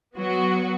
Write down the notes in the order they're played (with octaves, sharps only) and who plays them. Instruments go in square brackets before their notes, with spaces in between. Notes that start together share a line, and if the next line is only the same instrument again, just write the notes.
[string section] F#3 B3 F#4